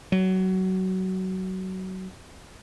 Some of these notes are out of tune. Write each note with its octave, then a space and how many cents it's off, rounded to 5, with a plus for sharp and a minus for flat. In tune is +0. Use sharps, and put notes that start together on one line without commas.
F#3 +20